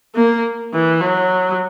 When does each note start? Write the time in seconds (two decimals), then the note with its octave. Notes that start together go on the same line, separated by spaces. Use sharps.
0.15 A#3
0.73 E3
1.01 F#3